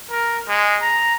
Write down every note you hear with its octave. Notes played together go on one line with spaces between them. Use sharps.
A#4
G#3
A#5